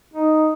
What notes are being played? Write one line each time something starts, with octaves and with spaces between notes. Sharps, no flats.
D#4